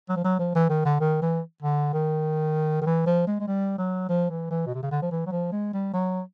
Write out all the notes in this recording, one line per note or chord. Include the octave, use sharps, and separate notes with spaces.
F#3
F3
F#3
F3
E3
D#3
D3
D#3
E3
D3
D#3
D#3
E3
F3
G#3
G#3
G3
F#3
F3
E3
E3
B2
C3
C#3
D3
F3
E3
F#3
F3
G#3
G3
F#3